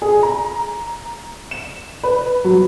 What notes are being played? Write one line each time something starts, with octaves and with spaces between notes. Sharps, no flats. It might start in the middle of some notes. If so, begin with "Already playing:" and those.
G#4
A#5
E7
B4
F#3